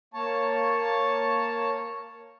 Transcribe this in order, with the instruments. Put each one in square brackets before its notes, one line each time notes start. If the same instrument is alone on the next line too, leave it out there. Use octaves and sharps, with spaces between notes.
[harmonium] A#3 C#5 A5